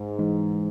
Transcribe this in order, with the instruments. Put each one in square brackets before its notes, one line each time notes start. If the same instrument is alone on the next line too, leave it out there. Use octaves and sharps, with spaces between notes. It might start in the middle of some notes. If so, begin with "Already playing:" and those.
Already playing: [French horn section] G#2
[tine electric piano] E3 G#3 D#4